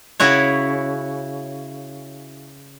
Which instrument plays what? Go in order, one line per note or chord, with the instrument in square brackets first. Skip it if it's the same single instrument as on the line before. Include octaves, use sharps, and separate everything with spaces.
[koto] C#3 E4 F#4 C#5